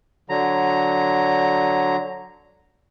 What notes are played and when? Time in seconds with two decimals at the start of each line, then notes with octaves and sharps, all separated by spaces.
0.29 D3 F#3 A#5